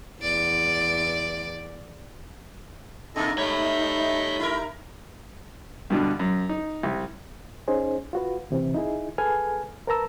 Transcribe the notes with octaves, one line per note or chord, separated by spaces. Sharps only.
E2 D5
B2 A#3 D#4 E4 A4 D#5
G3 A3 C#5 E5 B5 G6
E4 A#4
G2 B2 D3
F#2
D#4
C2
C#4 D#4 G#4 C5
F4 F#4 B4
D2 C3 E3 C4
D#4 E4 G#4
G#4 A4 B4 G#5 F6
A#4 B4 A5 A#5 E6